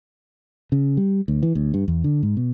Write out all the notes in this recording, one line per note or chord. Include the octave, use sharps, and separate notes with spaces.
C#3
G3
D2
E3
D2
G2
E2
D3
G#2
B2